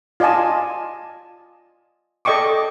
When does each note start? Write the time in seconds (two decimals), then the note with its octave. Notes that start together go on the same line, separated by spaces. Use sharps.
0.20 F4 D5 D#5 G#5 A5
2.25 A4 D5 D#5 G5 C#6 D6